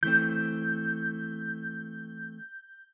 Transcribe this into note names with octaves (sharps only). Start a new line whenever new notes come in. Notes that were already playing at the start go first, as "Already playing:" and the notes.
E3 A3 C4 G6